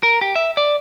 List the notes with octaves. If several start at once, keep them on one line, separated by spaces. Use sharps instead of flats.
A#4
G4
E5
D5